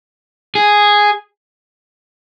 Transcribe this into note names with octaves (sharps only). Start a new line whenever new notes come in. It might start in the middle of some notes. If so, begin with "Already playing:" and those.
G#4